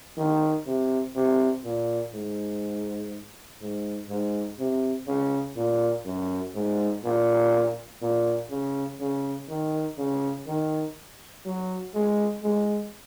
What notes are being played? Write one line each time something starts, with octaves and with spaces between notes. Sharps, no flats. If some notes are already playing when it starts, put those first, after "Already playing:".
D#3
C3
C3
A#2
G#2
G#2
G#2
C3
C#3
A#2
F#2
G#2
A#2
A#2
C#3
C#3
D#3
C#3
D#3
F#3
G#3
G#3